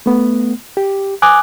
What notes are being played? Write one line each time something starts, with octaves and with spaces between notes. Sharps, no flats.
A3 B3
G4
G#5 D6 D#6 F#6